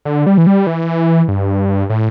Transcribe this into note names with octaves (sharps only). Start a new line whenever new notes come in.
D3
G3
E3
G3
E3
G2
A2